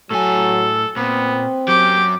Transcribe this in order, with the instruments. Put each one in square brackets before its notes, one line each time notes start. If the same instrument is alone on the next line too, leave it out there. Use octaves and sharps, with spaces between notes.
[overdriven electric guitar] A2 G#5 [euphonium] F#3 [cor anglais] A4
[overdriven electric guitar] A#2 [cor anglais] B3 [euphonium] C4
[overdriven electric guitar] F#2 F#3 [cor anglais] G4 [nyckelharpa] D6